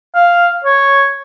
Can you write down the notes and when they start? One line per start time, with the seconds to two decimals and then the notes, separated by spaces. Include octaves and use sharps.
0.15 F5
0.64 C#5